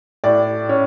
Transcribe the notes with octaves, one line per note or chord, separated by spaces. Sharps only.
A2 D5
C#4